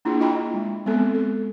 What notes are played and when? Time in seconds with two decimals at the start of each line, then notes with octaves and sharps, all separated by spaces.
0.05 A#3 D4 E4 F4 G#4
0.21 F4 D#5 G5 A#5 B5
0.54 G#3
0.86 G#3 B3 C4 A4
1.14 A4